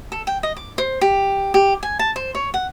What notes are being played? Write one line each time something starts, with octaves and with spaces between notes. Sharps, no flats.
A4
G5
D#5
D6
C5
G4
G4
G#5
A5
C5
C#5
F#5